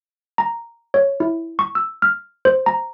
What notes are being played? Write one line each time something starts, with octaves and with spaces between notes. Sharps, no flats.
A#5
C#5
E4
C#6
E6
F6
C5
A#5